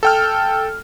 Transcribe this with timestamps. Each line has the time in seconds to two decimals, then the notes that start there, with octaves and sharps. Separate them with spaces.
0.03 A4 G5 F6